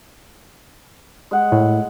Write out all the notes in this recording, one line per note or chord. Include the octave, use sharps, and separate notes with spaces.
G#3 F#5
A2